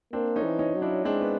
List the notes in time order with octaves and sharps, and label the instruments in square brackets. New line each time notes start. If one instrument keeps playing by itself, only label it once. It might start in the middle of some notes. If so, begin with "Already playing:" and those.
[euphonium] A#3 [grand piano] C4 D4
[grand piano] C#4 D#4
[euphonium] E3
[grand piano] C#4 D#4
[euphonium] F#3
[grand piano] D4 E4
[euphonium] G#3 [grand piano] C4 D4
[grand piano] B3